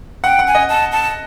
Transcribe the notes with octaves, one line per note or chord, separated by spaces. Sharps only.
F#5 G5
F#5
G#5
D#5
A5
A5